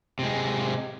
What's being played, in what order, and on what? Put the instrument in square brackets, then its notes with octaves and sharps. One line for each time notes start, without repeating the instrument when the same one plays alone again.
[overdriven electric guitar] C3 G#3